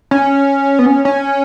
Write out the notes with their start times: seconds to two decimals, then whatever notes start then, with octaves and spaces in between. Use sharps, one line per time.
0.11 C#4
0.79 B3
0.86 C#4
1.05 C#4